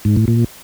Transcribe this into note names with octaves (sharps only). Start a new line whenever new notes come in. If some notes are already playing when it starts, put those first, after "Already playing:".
G#2
A2
A#2